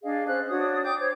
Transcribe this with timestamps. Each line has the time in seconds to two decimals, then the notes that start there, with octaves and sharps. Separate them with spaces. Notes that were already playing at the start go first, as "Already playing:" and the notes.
0.04 D4 G#4 D#5 F5
0.28 C#4 C5 F5 F#6
0.48 D4 F#4 C#5 D#6
0.83 G5 D6 D#6 G6
0.99 C5 C#5